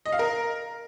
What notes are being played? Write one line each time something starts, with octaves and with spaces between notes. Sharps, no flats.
D#5
F5
A#4